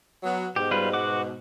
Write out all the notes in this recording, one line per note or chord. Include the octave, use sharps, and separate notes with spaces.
F#3 B3
G#2 B2 G4
G3 F4 B4
F#4 F#5 D6